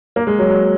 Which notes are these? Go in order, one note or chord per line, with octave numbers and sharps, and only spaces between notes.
A#3
G#3
F#3
F#3